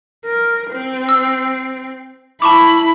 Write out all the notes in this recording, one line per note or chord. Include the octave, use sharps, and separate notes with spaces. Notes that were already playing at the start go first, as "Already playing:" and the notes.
A#4
C4
E6
E4 A5 B5 C#6 D6